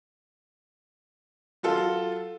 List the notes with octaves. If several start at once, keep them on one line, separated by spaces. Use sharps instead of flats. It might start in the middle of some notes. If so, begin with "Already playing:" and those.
F#3 F4 A4